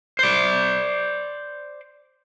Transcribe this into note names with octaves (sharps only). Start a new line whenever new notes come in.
C5 D5